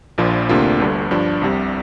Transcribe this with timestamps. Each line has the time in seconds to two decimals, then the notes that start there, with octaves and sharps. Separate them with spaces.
0.18 A#1 A#2 F3 D4 F4
0.49 D2 C3 A#3 D4 F4
0.80 G1 G2 D3
1.11 G2 F3 D4
1.42 C2 C3 G3